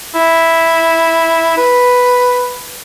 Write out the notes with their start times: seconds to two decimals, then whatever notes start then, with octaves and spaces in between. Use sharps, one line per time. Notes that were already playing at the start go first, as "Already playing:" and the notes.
0.15 E4
1.57 B4